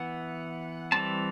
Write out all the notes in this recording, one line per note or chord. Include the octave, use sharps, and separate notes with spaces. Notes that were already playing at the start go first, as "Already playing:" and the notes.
Already playing: E3 B3 F#5
E3 G3 C4 A5